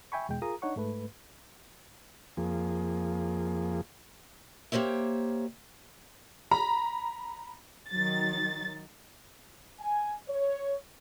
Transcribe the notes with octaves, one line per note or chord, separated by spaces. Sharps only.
E5 G5 G#5 B5 C#6
E2 B2 G#3 G5
F4 G#4 A#4 A#5 D#6
D4 D#4 C#5 F#5 C#6
G#2 A3 B4
F2 F3 A#3 G#4
A#3 G4 C5 C#5 E5
A#5 B5
D#3 F#3 A6
G#5
C#5